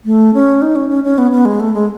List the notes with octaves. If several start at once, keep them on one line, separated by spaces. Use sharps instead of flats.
A3
C#4
D#4
C#4
C#4
C#4
B3
B3
G#3
A3
G#3